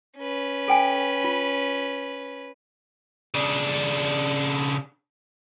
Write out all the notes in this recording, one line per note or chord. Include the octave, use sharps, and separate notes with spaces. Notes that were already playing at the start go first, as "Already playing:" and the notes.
C#4 B4
A4 G5 G#5
F4
C#3 D4